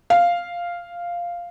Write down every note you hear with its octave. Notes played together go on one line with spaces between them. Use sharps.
F5